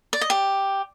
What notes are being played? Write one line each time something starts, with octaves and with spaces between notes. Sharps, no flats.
D5
D#5
G4